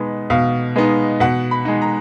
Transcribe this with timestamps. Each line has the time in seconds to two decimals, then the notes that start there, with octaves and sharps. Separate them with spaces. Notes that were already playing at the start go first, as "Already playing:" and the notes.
Already playing: B2 G#3 B3 D#4
0.30 B2 F5
0.76 G#3 B3 D#4
1.20 B2 F#5
1.51 B5
1.65 G#3 D#4
1.82 A#5